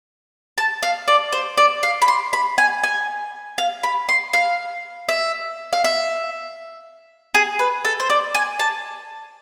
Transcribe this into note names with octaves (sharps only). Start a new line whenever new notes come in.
A5
F5
D5
C5
D5
F5
B5
C6
B5
G#5
G#5
F5
B5
C6
F5
E5
F5
E5
G#4
B4
A4
C5
D5
G#5
A5